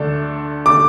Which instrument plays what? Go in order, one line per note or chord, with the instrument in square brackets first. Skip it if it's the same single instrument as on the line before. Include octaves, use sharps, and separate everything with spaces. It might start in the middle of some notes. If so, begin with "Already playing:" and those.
Already playing: [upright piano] D2 D3 A3 D4 A4
[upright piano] D3 A3 [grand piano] D6